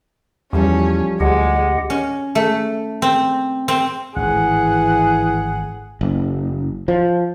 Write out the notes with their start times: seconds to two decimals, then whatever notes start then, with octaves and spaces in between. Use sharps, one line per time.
0.53 E2 F3 G3 C#4 A4
1.20 D2 G#3 G4 D#5 F#5
1.90 C#4
2.35 A3
3.02 C4
3.68 C4
4.16 G#1 A2 E3 G#4 F#5
6.01 F#1
6.88 F3